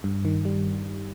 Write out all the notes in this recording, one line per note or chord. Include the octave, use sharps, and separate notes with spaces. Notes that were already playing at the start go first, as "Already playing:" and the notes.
G2
D#3
G3